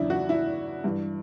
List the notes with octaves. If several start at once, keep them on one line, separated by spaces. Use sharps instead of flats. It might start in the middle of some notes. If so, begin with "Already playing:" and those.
Already playing: E2 C#3 F#3 D4 E4
F#4
E4
G2 E3